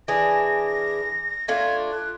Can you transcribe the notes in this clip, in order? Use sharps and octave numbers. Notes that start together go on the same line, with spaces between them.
E3 D4 G#4 A#6
A3 D4 F4 G#6
F#6